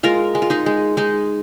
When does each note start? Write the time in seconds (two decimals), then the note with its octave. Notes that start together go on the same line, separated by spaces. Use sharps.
0.03 G#3 F4 A#4
0.35 G#3
0.42 F4
0.50 D#4 G#4
0.66 G#3
0.97 G#3 D#4 G#4